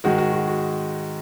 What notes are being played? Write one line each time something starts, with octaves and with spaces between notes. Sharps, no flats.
G#2 D#3 G#3 F#4
F#4
F#4
F#4